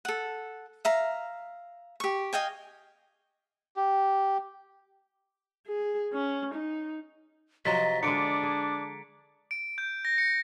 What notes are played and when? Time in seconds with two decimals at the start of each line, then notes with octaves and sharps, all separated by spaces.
0.05 A4 F#5
0.85 E5 F5 A#5
2.00 G4 C#6
2.33 D#5 F5 G5 G#5
3.76 G4
5.67 G#4
6.13 C#4
6.54 D#4
7.65 C3 F3 F#3 D#5 A#5 A6 B6
8.03 D3 G#3 D4 D6 C#7 D7
8.43 G#4
9.51 D7
9.78 G6
10.05 A#6
10.18 C#7